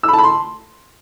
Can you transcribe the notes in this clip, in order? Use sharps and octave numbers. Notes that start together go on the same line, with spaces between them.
E6
B5
A5
B5
C6